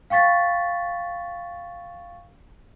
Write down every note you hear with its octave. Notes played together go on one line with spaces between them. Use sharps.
F5 G5 C#6 A6 B6